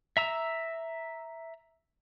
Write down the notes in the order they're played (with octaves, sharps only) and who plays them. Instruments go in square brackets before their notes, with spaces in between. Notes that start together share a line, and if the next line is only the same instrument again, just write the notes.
[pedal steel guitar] E5 A#5 E6